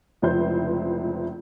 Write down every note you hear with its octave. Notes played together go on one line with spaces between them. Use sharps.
F1 C#2 E4 B4 C5 G6